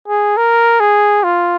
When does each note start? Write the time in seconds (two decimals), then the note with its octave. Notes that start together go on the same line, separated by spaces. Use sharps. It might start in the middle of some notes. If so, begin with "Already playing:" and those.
0.08 G#4
0.37 A#4
0.80 G#4
1.24 F4